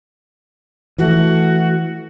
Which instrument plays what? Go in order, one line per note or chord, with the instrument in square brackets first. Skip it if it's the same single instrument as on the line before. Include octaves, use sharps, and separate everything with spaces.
[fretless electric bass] E3 A3 [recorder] F#4